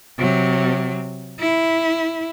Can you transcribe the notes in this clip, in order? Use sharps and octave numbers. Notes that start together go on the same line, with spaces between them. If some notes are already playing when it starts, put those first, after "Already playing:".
C3 F#3
E4